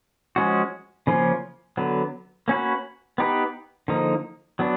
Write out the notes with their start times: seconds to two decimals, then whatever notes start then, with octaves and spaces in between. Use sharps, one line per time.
0.36 F3 G#3 C#4 F#4
1.07 C#3 F3 A#3 C#4
1.77 D3 F#3 B3
2.48 A#3 C#4 F#4 B4
3.18 B3 D#4 G4 B4
3.88 D3 F3 A#3 D#4
4.59 F#3 B3 D4